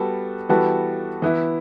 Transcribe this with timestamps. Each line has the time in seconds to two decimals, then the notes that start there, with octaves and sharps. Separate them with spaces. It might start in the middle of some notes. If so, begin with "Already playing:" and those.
Already playing: G3 B3 F#4 A4
0.49 E3 G3 B3 F#4 A4
1.22 E3 B3 E4